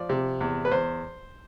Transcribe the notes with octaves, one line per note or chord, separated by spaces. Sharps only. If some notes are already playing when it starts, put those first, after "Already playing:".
Already playing: F3 D5
C3
E2
B4
E2 C5